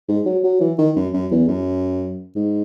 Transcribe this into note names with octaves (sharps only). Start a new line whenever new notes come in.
G#2
F#3
F#3
E3
D#3
F#2
F#2
E2
F#2
G#2